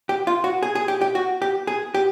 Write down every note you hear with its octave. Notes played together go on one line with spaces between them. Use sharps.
G4
F4
F#4
G#4
G#4
G4
G4
F#4
G4
G#4
G4